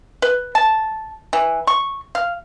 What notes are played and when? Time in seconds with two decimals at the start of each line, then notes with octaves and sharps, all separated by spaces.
0.22 B4
0.55 A5
1.33 E3
1.67 C#6
2.15 F5